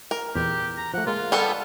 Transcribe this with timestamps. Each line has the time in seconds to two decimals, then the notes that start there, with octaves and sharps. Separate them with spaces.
0.11 A#4
0.35 E2 A#2 G4
0.77 A#5
0.94 F3 A3 F#5
1.07 G#3 A#3 F4
1.32 G3 B3 A4